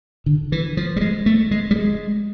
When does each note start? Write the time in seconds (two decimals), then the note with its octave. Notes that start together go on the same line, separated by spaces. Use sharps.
0.26 D3
0.52 E3
0.77 F3
0.96 G3
1.01 G#3
1.26 A3
1.51 G#3
1.71 G3
1.76 G#3